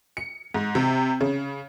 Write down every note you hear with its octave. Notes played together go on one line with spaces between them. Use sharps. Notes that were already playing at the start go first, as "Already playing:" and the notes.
C#7
G#2
C3
C#3